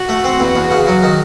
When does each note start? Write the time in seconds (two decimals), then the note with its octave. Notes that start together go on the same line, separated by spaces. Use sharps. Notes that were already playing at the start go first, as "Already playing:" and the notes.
Already playing: F#4
0.09 A3
0.24 C4
0.40 E2
0.55 E2
0.71 C#3
0.87 F#3
1.03 D#3